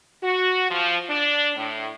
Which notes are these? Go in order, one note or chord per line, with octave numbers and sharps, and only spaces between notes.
F#4
F3
D4
A2